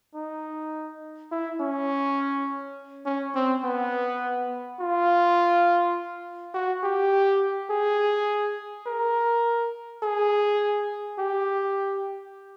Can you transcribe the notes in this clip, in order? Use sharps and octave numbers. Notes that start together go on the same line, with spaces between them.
D#4
E4
C#4
C#4
C4
B3
F4
F#4
G4
G#4
A#4
G#4
G4